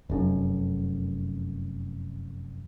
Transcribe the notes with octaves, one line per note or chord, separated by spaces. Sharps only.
F1 F#2